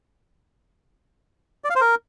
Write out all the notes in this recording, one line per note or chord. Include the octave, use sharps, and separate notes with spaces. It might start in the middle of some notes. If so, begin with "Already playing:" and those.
D5
F5
C5
A#4